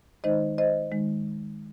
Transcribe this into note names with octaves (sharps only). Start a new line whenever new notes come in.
D#3 G#3 D#4 C5 D#5
C5 D#5
D#3 G#3 D#4